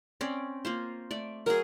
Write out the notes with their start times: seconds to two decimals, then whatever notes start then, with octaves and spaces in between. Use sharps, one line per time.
0.21 C4 C#4 D5
0.65 A#3 F4 C5
1.11 A3 D5
1.46 F#3 G#4 A#4